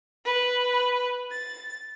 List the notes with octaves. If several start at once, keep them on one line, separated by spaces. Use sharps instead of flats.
B4
A6